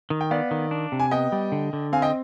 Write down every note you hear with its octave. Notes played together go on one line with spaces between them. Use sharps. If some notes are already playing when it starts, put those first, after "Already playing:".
D#3
G5
B3 D5 F5
D#3
D4
C3
G#5
B3 D#5 G5
G3
D3
D3
C4 F5 G#5
D#5 G5